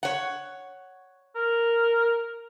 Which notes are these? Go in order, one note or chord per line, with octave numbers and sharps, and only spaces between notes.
C#5 F#5
A#4